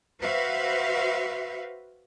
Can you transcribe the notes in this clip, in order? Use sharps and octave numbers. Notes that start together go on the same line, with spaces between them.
F#4 B4 C5 E5 F5